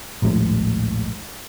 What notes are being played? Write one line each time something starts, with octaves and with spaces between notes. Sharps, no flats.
A#1 D#2 A2 G#3